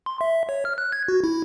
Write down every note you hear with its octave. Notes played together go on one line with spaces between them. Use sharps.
C6
E5
C#5
F6
F#6
G#6
F#4
E4